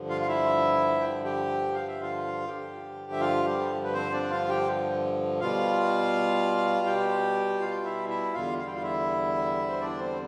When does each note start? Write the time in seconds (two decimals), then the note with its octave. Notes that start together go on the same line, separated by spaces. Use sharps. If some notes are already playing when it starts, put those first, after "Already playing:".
Already playing: G2 D3 F3
0.09 F4 F5
0.21 F5
0.28 E4 E5
1.01 G5
1.25 G4 G5
1.74 F5
1.88 E5
2.01 F4 F5
2.47 G2 D3 F3 G4 G5
3.12 E5
3.20 F4 F5
3.46 G3 G4
3.84 B4
3.94 C4 C5
4.12 D4 D5
4.30 F4 F5
4.49 G4 G5
5.40 B2 G3 F4 F5
6.87 G4 G5
7.61 F4 F5
7.84 E4 E5
8.09 E4 E5
8.34 E2 D3 G3 F4 F5
8.58 F5
8.66 G5
8.74 F4 F5
8.83 E4 E5
9.69 C5
9.81 D4 D5
9.99 C4 C5